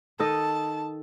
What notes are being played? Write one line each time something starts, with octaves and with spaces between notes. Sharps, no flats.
D#3 A4 D#5 A5